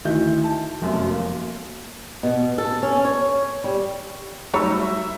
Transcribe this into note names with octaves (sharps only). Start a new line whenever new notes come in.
D2 D#3 E4 G6
A5
F1 F#2 B2
A#3
B2
A4
C#4
C#5
G3
F#3 G3 A3 D#4 C#5 A#5 B5 E6
E5